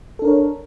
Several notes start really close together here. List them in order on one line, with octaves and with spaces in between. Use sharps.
A4 D4 A#4 C#5